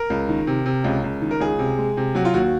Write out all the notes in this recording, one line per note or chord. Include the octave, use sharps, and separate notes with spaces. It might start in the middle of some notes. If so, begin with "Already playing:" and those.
Already playing: A#4
C#2
D#3
C3
C3
C#2
C#2
D#3
A#4
C#2 G#4
C3
G#3
C3
F#3 F#4
F4
D#2 F#4